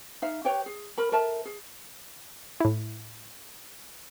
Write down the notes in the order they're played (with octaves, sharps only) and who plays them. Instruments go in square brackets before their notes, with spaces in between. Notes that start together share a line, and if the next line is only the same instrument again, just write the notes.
[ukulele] D#4 E5 F5
G4 B4 C#5 G5
G#4
A#4 B5
A4 A#4 E5 A5
G#4
[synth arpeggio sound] A2 E4